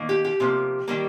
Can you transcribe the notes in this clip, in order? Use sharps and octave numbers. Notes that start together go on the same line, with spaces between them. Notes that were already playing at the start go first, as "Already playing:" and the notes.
Already playing: D#3 A#3
G4
G4
C3 F3 A#3
D#3 G3 A#3